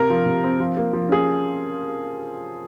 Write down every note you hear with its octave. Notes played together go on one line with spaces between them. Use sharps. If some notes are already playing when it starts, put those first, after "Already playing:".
Already playing: C3 A#4
F3
C3
C4
F3
A#3
F3
C#4 G#4